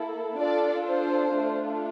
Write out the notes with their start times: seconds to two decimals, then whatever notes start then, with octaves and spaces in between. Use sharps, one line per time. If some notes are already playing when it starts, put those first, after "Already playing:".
Already playing: A#3 E4 A4
0.39 D4 F4 A4 D5
0.86 C5
1.33 A3 D4 F4